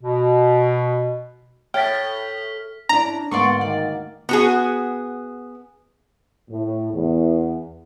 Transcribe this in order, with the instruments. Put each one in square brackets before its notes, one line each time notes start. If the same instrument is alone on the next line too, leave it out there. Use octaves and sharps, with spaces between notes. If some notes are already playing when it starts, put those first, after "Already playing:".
[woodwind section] B2
[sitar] A2 [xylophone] C#5 E5 A6 [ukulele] G5 [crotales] F6 B6
[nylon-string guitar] C#4 E4 D5 [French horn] D4 [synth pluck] A#5
[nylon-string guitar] D2 G#2 A#3 [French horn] B3 [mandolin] D5 C6 C#6
[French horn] D#3 [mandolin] D5
[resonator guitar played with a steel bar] B3 F#4 G#4
[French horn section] A2
E2